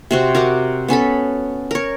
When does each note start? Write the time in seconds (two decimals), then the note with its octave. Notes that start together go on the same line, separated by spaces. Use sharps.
0.11 C3 C4 F#4
0.35 F#4 A#4 A#5 D6
0.88 B3 C#4 A4 B5
1.71 A#4 C#5